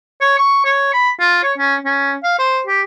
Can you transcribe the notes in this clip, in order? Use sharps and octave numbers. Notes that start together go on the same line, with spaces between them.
C#5
C#6
C#5
B5
F4
C#5
C#4
C#4
F5
C5
G4